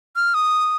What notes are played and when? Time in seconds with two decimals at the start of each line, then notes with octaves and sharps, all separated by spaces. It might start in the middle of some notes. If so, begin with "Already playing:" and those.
0.16 F6
0.34 D#6